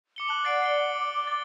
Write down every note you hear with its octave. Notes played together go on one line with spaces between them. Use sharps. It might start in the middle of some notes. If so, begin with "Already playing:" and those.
D6 C#7 G7
A5 F#6 F#7
D5 F#5 A6 C7 D7
C7 D7 G7
D6
A6 G7